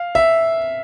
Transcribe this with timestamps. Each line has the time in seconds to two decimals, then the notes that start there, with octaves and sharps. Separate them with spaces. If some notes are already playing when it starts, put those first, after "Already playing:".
Already playing: F5
0.15 E5